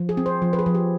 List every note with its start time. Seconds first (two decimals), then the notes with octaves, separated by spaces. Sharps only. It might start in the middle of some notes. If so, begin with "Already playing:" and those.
Already playing: F3
0.09 G#4
0.17 C4
0.26 C5
0.42 F3
0.53 B4
0.59 G#4
0.66 F3
0.75 G4